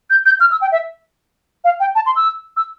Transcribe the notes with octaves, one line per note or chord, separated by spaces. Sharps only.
G6
G6
F6
E6
G5
E5
F5
G5
A5
C6
E6
E6